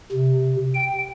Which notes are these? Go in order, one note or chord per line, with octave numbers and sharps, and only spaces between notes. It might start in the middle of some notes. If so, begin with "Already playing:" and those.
C3
G5